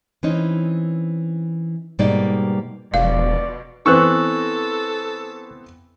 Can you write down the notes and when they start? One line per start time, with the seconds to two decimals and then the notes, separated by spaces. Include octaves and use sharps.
0.23 E3 C4 C#4 D#4
1.99 G#2 B2 G3 A#3 D#4 D5
2.94 E1 B2 F3 D5 F5
3.86 E3 B3 C4 A4 C#6 E6 F#6